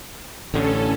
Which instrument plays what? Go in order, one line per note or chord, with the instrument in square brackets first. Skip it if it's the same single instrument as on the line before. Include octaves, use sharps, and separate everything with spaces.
[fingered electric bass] A1 A2 D3 [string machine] C#4 A4